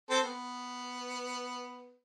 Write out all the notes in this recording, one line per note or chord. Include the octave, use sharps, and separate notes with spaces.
C4 A4 C5
B3